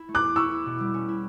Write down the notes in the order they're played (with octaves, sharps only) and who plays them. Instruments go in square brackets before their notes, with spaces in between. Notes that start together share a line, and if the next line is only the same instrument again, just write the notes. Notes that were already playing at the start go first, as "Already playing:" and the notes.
Already playing: [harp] E4
A3
[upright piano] D6 F#6
[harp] E2
[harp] E4 [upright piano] C#6 E6
[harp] E4
B2
G3
C#4
E4